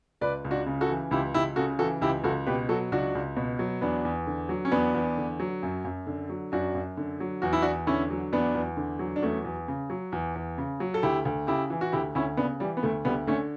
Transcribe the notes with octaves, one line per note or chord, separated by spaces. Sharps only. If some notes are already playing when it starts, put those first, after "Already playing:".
C#2 B4 D5
C#2
D4 F#4
C#3
F#4 A4
E3
C#2 E4 G4
C#2 E4 G4
C#3 F#4 A4
E3 F#4 A4
C#2 E4 G4
C#2 F#4 A4
B2 G4 B4
F#3 F#4 A4
C#2 D4 F#4
C#2
B2
F#3
E2 B3 D4
E2
D3
F#3
C#4
E2 B3 D4
E2
D3
F#3
F#2
F#2
D3
F#3
F#2 D4 F#4
F#2
D3
F#3
E2 F#4
E4
E2 D4 F#4
D3 C#4 E4
F#3
E2 B3 D4
E2
D3
F#3
D4
E2 A3 C#4
E2
C#3
F#3
E2
E2
C#3
F#3
A4
D2 E4 G4
D2
C#3 E4 G4
E3
F#4
D2 E4 G4
D2 C#4 E4
C#3 B3 D4
E3 G3
B3
D2 A3
D2 G3 B3
D3 A3 C#4